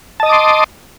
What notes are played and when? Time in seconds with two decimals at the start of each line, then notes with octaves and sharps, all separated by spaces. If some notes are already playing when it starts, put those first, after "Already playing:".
0.20 A5
0.23 D#5
0.26 D#6
0.29 D6
0.32 C6